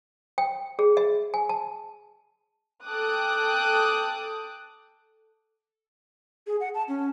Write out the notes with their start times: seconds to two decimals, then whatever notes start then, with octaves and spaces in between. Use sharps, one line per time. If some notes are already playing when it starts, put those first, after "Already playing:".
0.38 G5
0.79 G#4
0.97 E5
1.34 G#5
1.49 A5
2.86 A4 G5 D6 D#6 F#6
6.47 G#4
6.60 F#5
6.74 A5
6.88 C#4